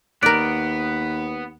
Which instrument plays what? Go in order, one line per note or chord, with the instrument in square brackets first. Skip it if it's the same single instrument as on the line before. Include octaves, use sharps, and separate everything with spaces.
[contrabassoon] D#2 [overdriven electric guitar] B3 [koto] A#4 D5 [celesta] F#6 D7